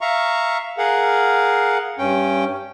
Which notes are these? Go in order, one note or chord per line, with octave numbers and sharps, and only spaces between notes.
E5 F5 A#5 C#6
G#4 A#4 F5 F#5
G2 C#4 G5